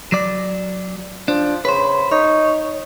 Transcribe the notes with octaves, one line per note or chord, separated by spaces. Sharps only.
F#3 D5
F3 D4
C#3 B4 C5
D#4 C#5